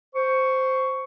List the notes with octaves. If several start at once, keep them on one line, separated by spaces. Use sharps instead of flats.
C5 C#6